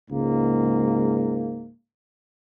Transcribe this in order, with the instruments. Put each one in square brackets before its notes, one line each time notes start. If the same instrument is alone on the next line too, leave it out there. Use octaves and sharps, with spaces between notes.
[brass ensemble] C#2 G#2 A#3